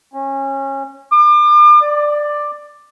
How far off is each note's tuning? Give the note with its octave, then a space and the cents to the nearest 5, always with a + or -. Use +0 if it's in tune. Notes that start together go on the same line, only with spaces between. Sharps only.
C#4 -25
D6 +40
D5 +10